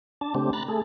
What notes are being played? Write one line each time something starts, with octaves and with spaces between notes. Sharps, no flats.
D4 A5
C#3 A3 C4 D4 G4
A#5 B5 F#6 A6
A3 G#4 A4